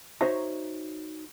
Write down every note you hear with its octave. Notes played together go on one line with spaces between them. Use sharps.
D#4 F#4 C5 C#5 E5 A#5